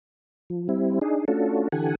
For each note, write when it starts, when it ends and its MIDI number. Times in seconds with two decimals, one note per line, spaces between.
0.50 0.68 53
0.69 0.99 55
0.69 0.99 60
0.69 0.99 64
1.01 1.25 62
1.01 1.25 63
1.01 1.25 68
1.28 1.68 57
1.28 1.68 61
1.28 1.68 62
1.28 1.68 65
1.28 1.68 66
1.28 1.68 69
1.72 1.95 50
1.72 1.95 52
1.72 1.95 67
1.72 1.95 69
1.72 1.95 78
1.72 1.95 80